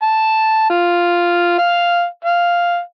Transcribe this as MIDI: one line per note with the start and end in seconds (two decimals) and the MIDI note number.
0.02 0.66 81
0.70 1.57 65
1.59 2.05 77
2.25 2.79 77